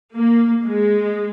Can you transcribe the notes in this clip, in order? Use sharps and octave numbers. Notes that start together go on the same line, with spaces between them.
A#3
G#3